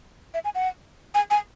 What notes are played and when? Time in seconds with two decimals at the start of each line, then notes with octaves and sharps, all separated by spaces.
0.34 E5
0.44 G#5
0.55 F#5
1.15 G#5
1.31 G#5